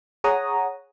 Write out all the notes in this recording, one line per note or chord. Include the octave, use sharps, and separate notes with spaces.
G#4 C#5 F#5 A#5 D#6